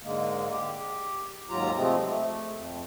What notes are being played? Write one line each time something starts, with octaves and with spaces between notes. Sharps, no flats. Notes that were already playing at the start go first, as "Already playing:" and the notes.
G#2 D3 G#3 A#3
G4
D#2 G#2 F#3 F4 G4 A#5
C3 F3 G#3 A3 C4
A3
F2